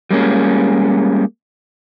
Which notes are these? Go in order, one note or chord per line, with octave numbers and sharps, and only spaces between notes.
G3 G#3 A#3 C#4